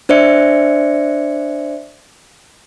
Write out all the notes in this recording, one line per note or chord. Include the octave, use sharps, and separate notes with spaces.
D4 C5 D5 E5 C#7